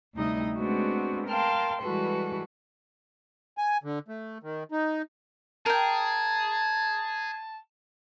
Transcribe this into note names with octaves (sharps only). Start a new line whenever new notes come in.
D2 C3 G3 D#4 E4 D#5
G#3 A3 B3 C4 D4 F#4
A#4 F5 G5 A5 C6
E3 G3 G#3 F#4 A4 B4
G#5
D3
A3
D#3
D#4
G#4 A#4 G5 A5